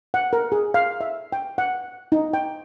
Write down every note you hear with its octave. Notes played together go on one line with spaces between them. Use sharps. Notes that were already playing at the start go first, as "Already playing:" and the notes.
F#5
A#4
G#4
F5
E5
G5
F#5
D#4
G5